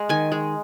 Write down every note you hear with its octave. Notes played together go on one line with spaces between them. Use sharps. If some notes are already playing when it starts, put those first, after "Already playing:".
Already playing: G#3
D#3 G#5
G#3